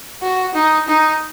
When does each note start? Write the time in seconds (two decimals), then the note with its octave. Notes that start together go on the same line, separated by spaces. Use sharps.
0.22 F#4
0.55 D#4
0.88 D#4